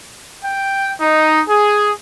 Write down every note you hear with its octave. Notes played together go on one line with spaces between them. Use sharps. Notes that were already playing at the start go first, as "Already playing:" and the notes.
G5
D#4
G#4